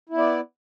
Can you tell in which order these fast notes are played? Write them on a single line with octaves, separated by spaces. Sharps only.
E4 B3 D5